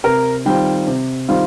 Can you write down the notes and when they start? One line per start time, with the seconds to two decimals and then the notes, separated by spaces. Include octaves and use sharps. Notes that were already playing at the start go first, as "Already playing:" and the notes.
0.04 C3 A#4
0.45 D#3 G3 C4 F4 G5
0.87 C3
1.28 D#3 G3 C4 F4